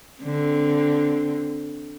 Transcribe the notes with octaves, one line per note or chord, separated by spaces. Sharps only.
D3 C4